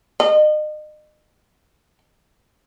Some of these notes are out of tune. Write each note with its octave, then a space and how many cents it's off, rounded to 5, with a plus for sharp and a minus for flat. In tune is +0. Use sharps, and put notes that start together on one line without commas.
D#5 -35